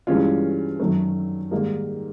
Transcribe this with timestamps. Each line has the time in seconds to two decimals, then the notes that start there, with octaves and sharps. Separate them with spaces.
0.07 G2 E3 G#3 C#4 F4
0.80 F#2 D#3 F#3 A3
1.51 G#2 D#3 G3 A#3